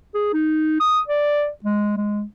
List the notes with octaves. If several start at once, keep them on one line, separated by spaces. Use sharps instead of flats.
G#4
D#4
D#6
D5
G#3
G#3